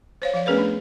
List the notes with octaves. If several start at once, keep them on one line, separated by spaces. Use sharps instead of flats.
C5 C#5 F5
F3 D5 F5
A3 B3 C#4 G#4 A#4 B4
D4